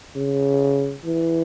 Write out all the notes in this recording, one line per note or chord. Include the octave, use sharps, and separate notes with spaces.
C#3
E3